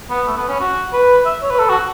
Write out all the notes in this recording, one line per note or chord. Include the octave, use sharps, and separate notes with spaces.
B3
A3
B3
C#4
F#4
B4
E5
C#5
B4
A4
F#4